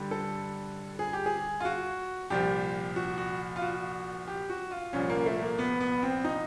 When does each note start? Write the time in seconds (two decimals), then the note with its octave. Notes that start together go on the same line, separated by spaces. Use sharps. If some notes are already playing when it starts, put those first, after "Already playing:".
Already playing: G2 D3 G3
0.11 A4
0.99 G#4
1.13 G4
1.26 G#4
1.60 F4
1.65 F#4
2.30 C2 A#2 F3 G4
2.96 F#4
3.18 F#4
3.56 F4
3.62 F#4
4.28 G4
4.49 F#4
4.71 F4
4.93 C2 A#2 F3 C#4
5.10 A#3
5.26 A3
5.42 A#3
5.59 B3
5.80 B3
6.03 C4
6.25 D#4